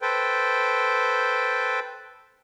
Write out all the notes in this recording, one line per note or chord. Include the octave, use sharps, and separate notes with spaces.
A4 B4 C5 G5